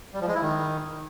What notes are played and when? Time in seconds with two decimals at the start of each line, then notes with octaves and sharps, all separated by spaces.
0.14 G3
0.21 F3
0.28 G#3
0.35 E4
0.42 D#3